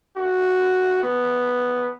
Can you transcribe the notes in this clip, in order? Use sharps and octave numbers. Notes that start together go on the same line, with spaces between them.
F#4
B3